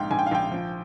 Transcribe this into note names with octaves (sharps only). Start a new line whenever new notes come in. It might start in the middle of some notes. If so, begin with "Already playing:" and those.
Already playing: A#1 G#2 F5 G5
A#1 G#5
G5
F5
A#1 G5
F3